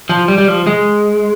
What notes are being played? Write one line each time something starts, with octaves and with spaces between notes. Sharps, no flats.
F3
G3
G3
F3
G#3